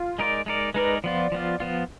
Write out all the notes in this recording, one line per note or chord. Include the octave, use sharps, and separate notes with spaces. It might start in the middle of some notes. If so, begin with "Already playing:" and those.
Already playing: F4
G#3 D#4 A#4 D5
G#3 D#4 A#4 D5
G#3 D#4 A#4 B4 D5
F3 B3 F4 D5
F3 B3 F4
F3 B3 F4